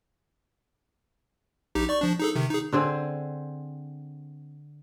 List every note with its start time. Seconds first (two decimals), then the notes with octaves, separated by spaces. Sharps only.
1.75 A#1 D#4 G4
1.89 D5 C#6
2.01 F3 D4
2.19 D#4 G#4 A4
2.35 C3 D#3
2.50 D#4 G#4
2.73 D3 C4 G#4